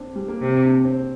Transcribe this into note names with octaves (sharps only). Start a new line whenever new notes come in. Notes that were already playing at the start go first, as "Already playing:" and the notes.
Already playing: C4 D4
G3
A#3
C3 C4
D4
C4